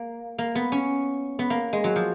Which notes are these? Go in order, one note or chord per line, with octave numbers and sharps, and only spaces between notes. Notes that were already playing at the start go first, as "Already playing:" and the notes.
Already playing: A#3
A#3
B3
C#4
B3
A#3
G#3
F#3
F3